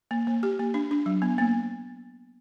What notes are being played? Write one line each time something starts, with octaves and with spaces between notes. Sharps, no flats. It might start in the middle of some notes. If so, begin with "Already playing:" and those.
A#3
A#3
G4
A#3
D4
D4
F#3
B3
A#3